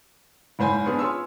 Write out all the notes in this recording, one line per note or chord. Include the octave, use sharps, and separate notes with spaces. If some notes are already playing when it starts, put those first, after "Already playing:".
F#1 G#2 C5 G#5 B5
B3 C#4 D4 G#4 B4
F4 G#4 B4 C#5 C6 E6